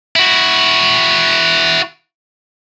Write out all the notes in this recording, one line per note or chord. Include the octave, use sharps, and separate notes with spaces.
E4 F#4